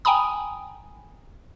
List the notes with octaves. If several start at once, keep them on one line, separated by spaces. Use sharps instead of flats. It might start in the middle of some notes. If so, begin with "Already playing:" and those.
G5 G#5 A#5 B5 D#6